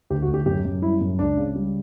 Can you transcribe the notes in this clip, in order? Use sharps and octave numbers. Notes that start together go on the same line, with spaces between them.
D2 G4
F#4
D2
G4
F#2 G4
F#2
G3 E4
F#2
C#2 D4
C#3
G3